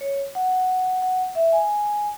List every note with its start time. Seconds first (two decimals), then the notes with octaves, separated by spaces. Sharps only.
0.01 C#5
0.35 F#5
0.51 F#5
1.02 F#5
1.35 E5
1.52 G#5